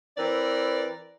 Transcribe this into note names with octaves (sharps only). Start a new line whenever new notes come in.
E3 C4 A#4 B4 D5